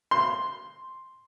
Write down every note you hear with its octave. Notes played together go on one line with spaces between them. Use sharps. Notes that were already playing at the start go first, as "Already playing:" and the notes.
C6